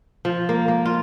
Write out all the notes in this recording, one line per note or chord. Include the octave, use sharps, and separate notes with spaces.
F3
A#3
A#3
F4